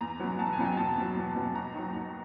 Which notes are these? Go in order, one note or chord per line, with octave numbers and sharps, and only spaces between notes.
E2 A#5
B2 F#3
E2 A5
G#5
B2 F#3
G5
E2 A5
B2 F#3
E2
B2 F#3
D#2 A#5
D#3 F#3
D#2 A#5